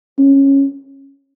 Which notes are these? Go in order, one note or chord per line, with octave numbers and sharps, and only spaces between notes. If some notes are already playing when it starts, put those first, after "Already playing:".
C#4